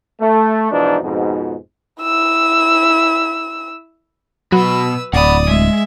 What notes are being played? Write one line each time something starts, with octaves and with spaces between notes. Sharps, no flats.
A3
G#2 B2 E3 F3 D4 D#4
F2 G#2 B2
E4 E6
B2 F#3 F#4 B4 B5 E6
D1 D5 F#5 B5 D#6
G#3 E5